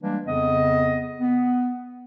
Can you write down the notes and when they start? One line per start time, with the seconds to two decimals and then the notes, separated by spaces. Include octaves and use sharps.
0.03 E3 G3 G#3 A#3 D4
0.27 F2 C#3 B3 D#5
1.20 B3